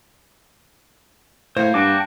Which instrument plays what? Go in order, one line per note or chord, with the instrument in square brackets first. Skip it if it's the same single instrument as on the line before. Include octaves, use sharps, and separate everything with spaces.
[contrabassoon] A2 [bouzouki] A#3 [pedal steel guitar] C5 [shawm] C#5
[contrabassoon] G2 [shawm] F#4 [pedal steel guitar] G5 A5 D6